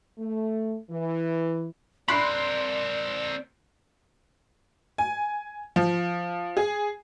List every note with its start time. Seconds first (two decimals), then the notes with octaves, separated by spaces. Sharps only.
0.18 A3
0.89 E3
2.08 C4 A#4 D5 B5 C6 F#6 C7
4.98 G#5
5.76 F3
6.57 G#4